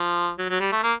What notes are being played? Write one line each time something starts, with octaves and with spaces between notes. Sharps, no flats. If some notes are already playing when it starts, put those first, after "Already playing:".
Already playing: F3
F#3
F#3
G3
A3
A#3